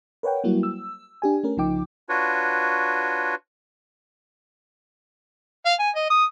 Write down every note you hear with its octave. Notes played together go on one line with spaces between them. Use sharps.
A#4 B4 C#5 F#5 G5
F#3 G3 A#3 E4 F#4
E6
D4 G4 G#5
A3 C#4 A#4
C2 C#3 F3 D#4 G5 D6
D4 F4 F#4 B4 C#5
F5
G#5
D#5
D#6